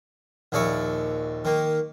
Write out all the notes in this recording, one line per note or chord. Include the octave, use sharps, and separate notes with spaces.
A#1 D#2 D#4 D5 E5 C#6
D#3 A#3